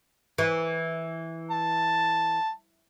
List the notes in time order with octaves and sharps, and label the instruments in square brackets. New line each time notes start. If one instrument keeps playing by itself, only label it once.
[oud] E3
[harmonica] A5